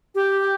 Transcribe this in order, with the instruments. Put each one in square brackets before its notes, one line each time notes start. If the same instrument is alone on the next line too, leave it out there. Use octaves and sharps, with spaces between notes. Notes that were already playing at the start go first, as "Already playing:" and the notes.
[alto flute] G4